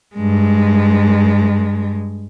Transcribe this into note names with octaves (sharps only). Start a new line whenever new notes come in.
G2 G#3